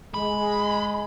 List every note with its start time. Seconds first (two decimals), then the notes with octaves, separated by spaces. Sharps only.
0.14 G#3 B5